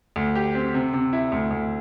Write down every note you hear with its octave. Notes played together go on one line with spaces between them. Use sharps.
D2
G4
C4
C3
C3
E4
D2
D2